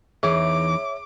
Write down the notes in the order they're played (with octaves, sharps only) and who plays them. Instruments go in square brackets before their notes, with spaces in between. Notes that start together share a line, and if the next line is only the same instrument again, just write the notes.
[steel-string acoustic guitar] E2 E3 D#4 [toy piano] G#4 [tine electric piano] C#5 E5 [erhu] D6